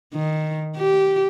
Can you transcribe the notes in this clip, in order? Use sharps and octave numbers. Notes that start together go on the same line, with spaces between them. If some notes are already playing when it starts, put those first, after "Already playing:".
D#3
G4